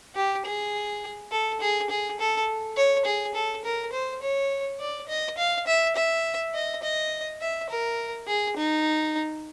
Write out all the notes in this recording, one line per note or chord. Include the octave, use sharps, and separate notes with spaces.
G4
G#4
A4
G#4
G#4
A4
C#5
G#4
A4
A#4
C5
C#5
D5
D#5
F5
E5
E5
D#5
D#5
E5
A#4
G#4
D#4